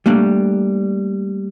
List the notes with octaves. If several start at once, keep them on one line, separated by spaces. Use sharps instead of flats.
G3 A3 A#3 D4